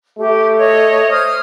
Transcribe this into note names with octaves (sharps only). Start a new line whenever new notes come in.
A3 G4
C#5 D#5
C5 D#6 F6